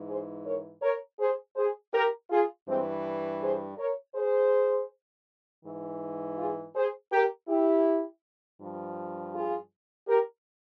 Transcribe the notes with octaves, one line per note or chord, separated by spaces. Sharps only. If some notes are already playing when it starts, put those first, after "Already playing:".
Already playing: G#2 E3
G#4 C5
A#4 C#5
A#4 C#5
G#4 C5
G#4 C5
G4 A#4
F4 G#4
G2 E3 G#3 C4
G#4 C5
A#4 C#5
G#4 C5
G#2 E3
F4 G#4
G#4 C5
G4 A#4
E4 G4
G2 F3
F4 G#4
G4 A#4